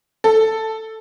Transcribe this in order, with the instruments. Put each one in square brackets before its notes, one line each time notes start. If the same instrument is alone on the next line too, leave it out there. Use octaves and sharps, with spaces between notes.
[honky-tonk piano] A4